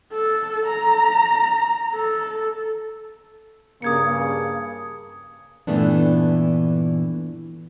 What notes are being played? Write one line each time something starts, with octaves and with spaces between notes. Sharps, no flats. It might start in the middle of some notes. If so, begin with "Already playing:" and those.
A4
A#5
A4
G2 C#3 A#3 D#6 G#6 C#7
G2 A#2 E3 A3 B3 D4